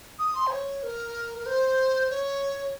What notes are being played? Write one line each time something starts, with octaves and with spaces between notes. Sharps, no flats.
D#6
C6
C5
C#5
A#4
A#4
C5
C#5